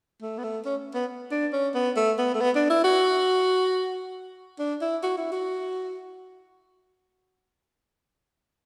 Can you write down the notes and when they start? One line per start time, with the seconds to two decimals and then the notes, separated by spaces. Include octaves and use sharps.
0.22 A3
0.38 B3
0.44 A3
0.65 C#4
0.95 B3
1.31 D4
1.53 C#4
1.75 B3
1.96 A3
2.18 B3
2.34 A3
2.40 B3
2.55 D4
2.70 E4
2.84 F#4
4.59 D4
4.81 E4
5.03 F#4
5.17 E4
5.32 F#4